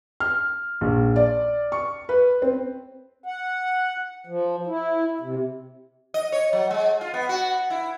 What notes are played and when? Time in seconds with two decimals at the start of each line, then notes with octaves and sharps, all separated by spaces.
0.20 F6
0.81 A#1
1.16 D5
1.72 C#6
2.09 B4
2.42 C4
3.24 F#5
4.27 F3
4.67 E4
5.21 C3
6.14 D#5
6.32 C#5
6.53 F#3
6.71 G#3
7.01 F4
7.14 B3
7.29 F#4
7.70 E4